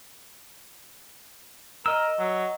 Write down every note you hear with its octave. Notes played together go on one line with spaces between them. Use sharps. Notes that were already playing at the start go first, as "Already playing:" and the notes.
A#4 D#5 E6
F#3